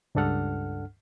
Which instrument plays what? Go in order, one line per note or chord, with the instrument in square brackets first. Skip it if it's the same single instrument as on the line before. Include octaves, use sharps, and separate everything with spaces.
[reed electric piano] C#2 G2 D4 A4 F#5 F6